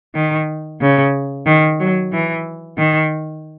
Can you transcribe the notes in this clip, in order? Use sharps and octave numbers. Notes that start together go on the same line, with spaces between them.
D#3
C#3
D#3
F#3
E3
D#3